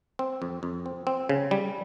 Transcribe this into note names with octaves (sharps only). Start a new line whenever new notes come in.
C4
F2
F2
C4
C4
C#3
G3